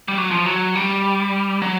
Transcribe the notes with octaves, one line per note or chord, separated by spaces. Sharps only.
G3
F#3
F3
F#3
G3
F#3